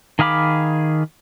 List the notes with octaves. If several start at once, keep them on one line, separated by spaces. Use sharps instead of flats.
D#3 G#4 F5 B5 D6